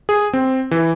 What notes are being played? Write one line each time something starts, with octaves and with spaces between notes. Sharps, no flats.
G#4
C4
E3